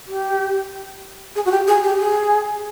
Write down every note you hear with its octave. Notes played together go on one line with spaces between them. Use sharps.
G4
G#4
F#4
G4
G#4
G4
G#4